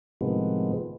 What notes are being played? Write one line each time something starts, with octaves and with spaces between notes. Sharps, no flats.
A2 C3 D#3 F3 G#3 B3